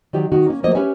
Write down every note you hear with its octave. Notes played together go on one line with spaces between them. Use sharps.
D#3 F#3 G4 D5
D#3 D#4 F#4
A#3 C#4
F3 F#3 A#3 D#5
C#4 G4 B4 C#5 E5 G#5